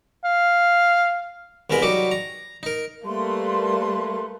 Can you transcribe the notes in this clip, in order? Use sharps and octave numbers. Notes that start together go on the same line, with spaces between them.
F5
C2 G#3 B3 A#4 G#5 B5
F#3 G3 D#4 F#4 D6
A#5
D#4 A#4
G3 A3 A#3 B4 C6